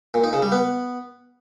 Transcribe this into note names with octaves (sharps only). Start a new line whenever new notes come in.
A#2
D#4
C#3
G3
B3